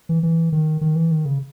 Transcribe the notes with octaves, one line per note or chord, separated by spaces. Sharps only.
E3
E3
D#3
D#3
E3
D#3
C#3